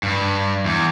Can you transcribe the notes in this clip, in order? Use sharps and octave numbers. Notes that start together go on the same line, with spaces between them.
G2
E2